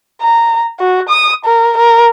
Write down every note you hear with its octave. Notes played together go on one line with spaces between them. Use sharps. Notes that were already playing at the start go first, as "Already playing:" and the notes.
A#5
F#4
D#6
A#4
A#4